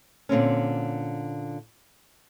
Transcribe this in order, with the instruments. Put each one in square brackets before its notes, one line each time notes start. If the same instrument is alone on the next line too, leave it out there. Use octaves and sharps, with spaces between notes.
[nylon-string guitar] A#2 D3 C4 C#4